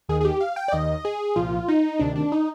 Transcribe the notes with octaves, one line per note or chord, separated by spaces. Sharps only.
D#2 D#3 G#4
G#4
G4
F5
G5
D5
D#2 D#3 D#5
G#4
C2 A#2 F3 F4
D#4
D2 C3 D#3 D4
D4
D#4